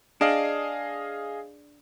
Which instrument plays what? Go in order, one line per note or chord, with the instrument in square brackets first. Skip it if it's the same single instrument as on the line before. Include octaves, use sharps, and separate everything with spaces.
[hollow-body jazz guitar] D4 [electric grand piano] G#4 D#5 F5